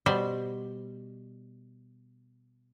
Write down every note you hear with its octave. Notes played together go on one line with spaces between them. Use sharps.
B2 G3 C5